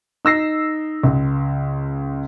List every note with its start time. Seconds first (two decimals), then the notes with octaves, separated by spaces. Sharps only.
0.25 D#4 E6 A#6 C7
1.04 C#2